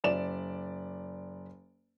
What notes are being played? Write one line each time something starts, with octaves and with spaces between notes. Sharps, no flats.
F#1 D5 E7